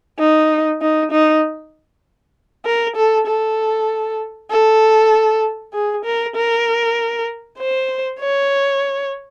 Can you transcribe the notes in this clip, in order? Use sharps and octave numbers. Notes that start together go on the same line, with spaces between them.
D#4
D#4
D#4
A#4
A4
A4
A4
G#4
A#4
A#4
C5
C#5